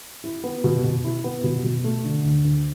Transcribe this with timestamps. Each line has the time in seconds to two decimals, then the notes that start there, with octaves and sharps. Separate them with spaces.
0.24 E4
0.44 B3
0.64 B2
0.84 B2
1.05 E4
1.24 B3
1.44 B2
1.64 B2
1.84 A3
2.04 D3
2.24 D2
2.45 D2